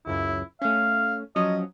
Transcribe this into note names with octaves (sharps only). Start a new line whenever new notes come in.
C#2 F#2 E4
A3 C#4 F5
F3 F#3 C#4 D#5